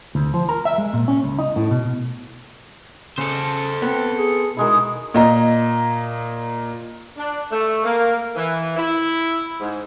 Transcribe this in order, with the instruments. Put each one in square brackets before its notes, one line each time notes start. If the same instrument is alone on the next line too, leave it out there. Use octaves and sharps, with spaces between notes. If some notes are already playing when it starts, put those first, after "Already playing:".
[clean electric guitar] D2
F3
A#4
E5
G#3
A#2
C#4
C#2
D#4
A2
B2
[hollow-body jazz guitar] C#3 [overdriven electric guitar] A4 C5
[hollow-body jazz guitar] B3 [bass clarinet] C4
[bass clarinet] G#4
[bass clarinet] B2 [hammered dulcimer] D#3 G#3 E4
[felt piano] A#2 D#5 A#5
[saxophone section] D4
A3
A#3
E3
E4
G#2